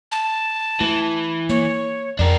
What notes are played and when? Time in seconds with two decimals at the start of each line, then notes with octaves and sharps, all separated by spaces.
0.12 A5
0.81 E3 A3
1.49 A#3 C#5
2.19 F2 D4 A#4